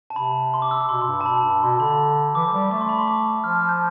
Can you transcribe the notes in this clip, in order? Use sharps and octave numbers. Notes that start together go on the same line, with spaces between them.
A5
C3 B5
C6
D6
E6
D6
B2 C6
C6
G2
B5
A5
B2 B5
A5
G2
B5
B2 C6
D3 B5
E3 D6
F3
G3
A3 D6
C6
B5
C6
D6
F3 F6
F6
G6